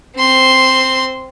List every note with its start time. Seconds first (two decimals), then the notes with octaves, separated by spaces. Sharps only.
0.16 C4 C6